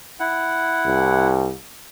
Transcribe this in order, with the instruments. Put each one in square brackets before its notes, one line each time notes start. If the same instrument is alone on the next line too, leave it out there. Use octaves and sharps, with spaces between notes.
[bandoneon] E4 F#5
[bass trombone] C2